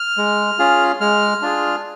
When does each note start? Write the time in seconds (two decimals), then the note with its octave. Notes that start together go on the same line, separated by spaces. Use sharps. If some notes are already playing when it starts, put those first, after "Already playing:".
Already playing: F6
0.17 G#3
0.59 C#4 F4 G#4
1.00 G#3 F6
1.42 D4 F4 G#4